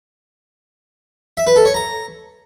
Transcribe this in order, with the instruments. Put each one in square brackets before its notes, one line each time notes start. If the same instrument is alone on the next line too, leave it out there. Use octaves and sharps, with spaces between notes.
[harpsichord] E5
B4
A4
C#5
A#5